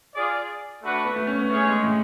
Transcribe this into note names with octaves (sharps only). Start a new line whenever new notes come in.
F4 G#4 D5
A3 D4 F#4 B4 F#5
B3
A3
C#4
B3
A3 C#4 G#4 C#5
G#3
A2